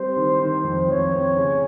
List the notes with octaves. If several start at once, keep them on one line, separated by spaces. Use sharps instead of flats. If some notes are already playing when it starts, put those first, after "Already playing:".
Already playing: G3 C4 C5
D#3
D#3
F2
F2 C#5
C4
C#3